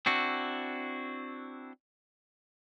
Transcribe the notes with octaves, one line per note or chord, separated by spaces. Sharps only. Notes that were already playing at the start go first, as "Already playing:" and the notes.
C4 D4 E4 F#4